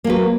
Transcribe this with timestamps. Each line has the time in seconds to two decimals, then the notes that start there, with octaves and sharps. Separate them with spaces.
0.04 A#3
0.07 F#3
0.10 B4